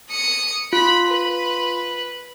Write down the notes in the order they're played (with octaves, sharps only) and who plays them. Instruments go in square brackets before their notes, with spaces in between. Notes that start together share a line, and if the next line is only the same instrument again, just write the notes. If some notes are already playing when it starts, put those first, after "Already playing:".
[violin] D#6 C#7
[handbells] F4 [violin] B5
[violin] B4